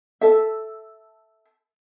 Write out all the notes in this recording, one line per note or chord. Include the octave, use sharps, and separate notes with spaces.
A4 E5